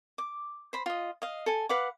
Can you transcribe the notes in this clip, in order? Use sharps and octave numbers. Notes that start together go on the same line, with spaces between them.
D6
C5 B5
F4 D#5
D#5 F5
A4 G#5
B4 F5 F#5 D6